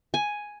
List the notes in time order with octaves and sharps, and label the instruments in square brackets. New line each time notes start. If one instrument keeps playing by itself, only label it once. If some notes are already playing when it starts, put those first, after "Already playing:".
[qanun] G#5